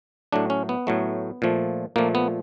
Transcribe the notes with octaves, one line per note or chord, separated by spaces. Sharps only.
A2 F#3 A3 D4
C#4
B3
A2 F#3 A3
A#2 F3 A3
A#2 F3 A3 A#3
B3